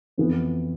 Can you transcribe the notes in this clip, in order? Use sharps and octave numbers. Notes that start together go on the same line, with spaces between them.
F2 E3 B3